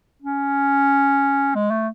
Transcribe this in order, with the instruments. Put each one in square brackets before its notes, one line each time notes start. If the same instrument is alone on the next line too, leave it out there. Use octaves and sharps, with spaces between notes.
[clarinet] C#4
G#3
A3